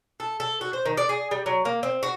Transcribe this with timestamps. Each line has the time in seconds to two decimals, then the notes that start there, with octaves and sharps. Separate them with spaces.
0.20 A4
0.40 A4
0.61 F#4
0.73 C5
0.86 D#3
0.97 D5
1.09 G#4
1.31 G3
1.46 F#3
1.65 A#3
1.83 C4
2.03 F#4